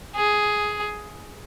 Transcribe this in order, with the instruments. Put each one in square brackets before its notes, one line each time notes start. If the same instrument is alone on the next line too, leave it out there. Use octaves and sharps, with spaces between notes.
[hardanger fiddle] G#4